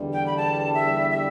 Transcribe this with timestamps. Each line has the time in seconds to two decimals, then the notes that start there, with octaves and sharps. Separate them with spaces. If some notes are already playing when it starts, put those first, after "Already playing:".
Already playing: E2 D3 G3
0.13 G5
0.27 B5
0.37 A5
0.74 E5
1.11 E5